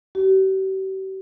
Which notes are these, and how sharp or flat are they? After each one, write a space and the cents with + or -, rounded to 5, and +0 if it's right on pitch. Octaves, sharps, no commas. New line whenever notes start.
G4 -45